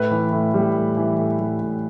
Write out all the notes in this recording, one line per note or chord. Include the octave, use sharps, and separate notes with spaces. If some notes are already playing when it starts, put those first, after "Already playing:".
Already playing: A2 B4
E3
A2
G3
A2
E3
A2
G3
A2